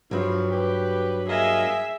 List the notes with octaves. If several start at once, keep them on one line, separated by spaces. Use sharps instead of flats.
G2 F3 F#3
G4 B4
A#3 G#4 D#5 E5 G#5